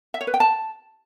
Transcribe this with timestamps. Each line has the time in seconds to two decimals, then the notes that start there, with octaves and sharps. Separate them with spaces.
0.14 E5
0.21 C#5
0.27 B4
0.34 G5
0.40 A5